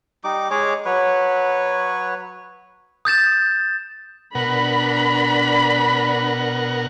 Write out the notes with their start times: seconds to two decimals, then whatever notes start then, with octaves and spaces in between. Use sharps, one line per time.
0.24 G3 D#4 D6
0.50 G#3 G#4 C#5 D6
0.85 F#3 B4 C#5
3.05 D#6 G6 A6 E7
4.35 B2 D4 A#4 F#5 B5